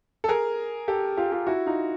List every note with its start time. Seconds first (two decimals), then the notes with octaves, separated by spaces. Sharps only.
0.24 A4
0.28 G#4 A#4
0.88 G4 A4
1.17 F4 G4
1.32 F4 G4
1.47 E4 F#4
1.66 D#4 F4